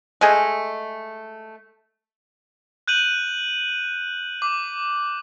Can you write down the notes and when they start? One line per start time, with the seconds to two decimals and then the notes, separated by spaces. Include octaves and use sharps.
0.21 G#3 A3 G#4 D#5
2.88 F#6 G6 D#7 F#7
4.42 D6